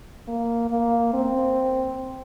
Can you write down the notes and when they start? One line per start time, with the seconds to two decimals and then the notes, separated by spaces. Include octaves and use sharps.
0.28 A#3
0.71 A#3
1.14 C4